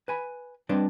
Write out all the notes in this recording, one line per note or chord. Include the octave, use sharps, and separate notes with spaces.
B4 G#5 B5
G3 C4 D4 B4 D5 D#5